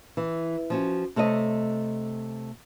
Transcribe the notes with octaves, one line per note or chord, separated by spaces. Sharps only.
E3
F3 C#4 F#4
C3 A3 A4 C#5 D#5